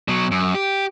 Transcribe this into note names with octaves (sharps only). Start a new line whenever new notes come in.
B2 F#3
F#2
G4